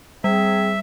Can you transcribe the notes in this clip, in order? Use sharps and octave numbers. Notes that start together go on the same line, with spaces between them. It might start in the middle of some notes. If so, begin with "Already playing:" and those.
G3 C4 G#4 E5